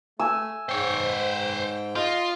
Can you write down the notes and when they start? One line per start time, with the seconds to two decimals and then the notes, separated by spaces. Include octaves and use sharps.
0.19 A3 G#5 E6
0.69 G#2 C5 C#5 G5
1.96 F4 D#5 C6